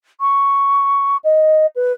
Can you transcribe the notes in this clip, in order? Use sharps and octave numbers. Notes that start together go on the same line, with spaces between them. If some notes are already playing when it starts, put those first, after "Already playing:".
C#6
D#5
B4